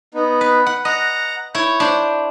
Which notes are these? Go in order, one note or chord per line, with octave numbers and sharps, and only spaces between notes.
B3 D#4
B4
F#5
D#5 F#5 A#5
E4 C#5 G6
D4 C5